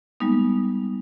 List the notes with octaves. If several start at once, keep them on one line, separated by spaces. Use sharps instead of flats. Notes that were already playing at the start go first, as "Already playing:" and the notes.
G3 G#3 A#3 B3 D#4